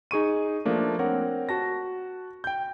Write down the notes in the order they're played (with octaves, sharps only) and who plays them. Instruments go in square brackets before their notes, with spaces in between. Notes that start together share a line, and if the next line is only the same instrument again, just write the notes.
[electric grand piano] D#4 G#4 C#6 D#7
F3 A3 A#3 D4
C4 A#4 C#5 F#5
F#4 A5 A#6
G5 G6